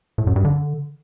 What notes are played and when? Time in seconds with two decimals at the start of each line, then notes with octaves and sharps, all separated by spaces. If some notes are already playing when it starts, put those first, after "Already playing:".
0.18 A2
0.27 F#2
0.36 G2
0.45 D3